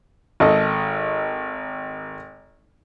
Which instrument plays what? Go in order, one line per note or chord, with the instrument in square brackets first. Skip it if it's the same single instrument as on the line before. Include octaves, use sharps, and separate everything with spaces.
[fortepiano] G#1 A4 D#5